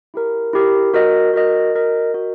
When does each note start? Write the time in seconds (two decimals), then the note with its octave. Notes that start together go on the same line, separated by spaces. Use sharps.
0.14 E4 G4 A#4
0.53 E4 G4 A#4
0.94 F#4 A#4 D#5
1.34 F#4 A#4 D#5
1.74 F#4 A#4 D#5
2.14 F#4 A#4 D#5